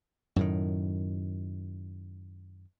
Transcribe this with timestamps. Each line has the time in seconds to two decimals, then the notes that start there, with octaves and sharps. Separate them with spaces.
0.36 F#2 A2 D#3